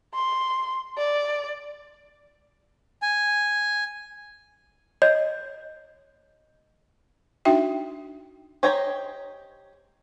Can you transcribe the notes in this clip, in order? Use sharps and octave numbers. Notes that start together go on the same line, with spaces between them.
C6
D5
G#5
C#5 D#5 G6
D4 D#4 F#4 E5 G5
G4 C5 C#5 D#5 A#5